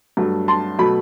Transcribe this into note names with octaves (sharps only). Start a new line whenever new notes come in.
G2 F#3 A3
A5 C6
B2 F#3 A3 B5